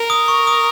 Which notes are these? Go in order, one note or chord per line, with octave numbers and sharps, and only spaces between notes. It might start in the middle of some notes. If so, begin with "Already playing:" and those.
Already playing: A#4
D#6
C#6
D#6